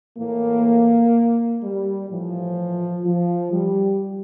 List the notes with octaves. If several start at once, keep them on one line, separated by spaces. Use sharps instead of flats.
A2 E3 A#3
G3
A2 E3 F3
F3
G3